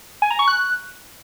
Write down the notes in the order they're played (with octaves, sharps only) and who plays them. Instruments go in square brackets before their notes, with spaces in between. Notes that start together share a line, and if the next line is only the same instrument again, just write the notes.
[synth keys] G#5
A#5
C#6
F#6